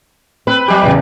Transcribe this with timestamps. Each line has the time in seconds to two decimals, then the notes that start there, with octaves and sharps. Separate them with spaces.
0.47 C4 B4
0.68 F#3 G4
0.83 E2 C#3